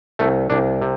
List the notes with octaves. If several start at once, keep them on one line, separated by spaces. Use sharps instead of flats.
C2 A3
C2 D4
C3